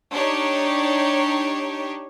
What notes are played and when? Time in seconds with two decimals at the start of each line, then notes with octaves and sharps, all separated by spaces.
0.12 D4 D#4 G4 C#5